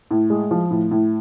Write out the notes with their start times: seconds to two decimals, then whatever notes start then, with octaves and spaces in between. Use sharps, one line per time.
0.11 A2
0.30 G#3
0.51 F3
0.71 A2
0.91 A2